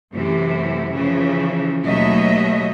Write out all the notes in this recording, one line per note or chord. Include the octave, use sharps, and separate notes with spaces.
F#2 C3 E3 A3
C#3 E3 F3
D#2 B2 F#3 A3 D#5 E5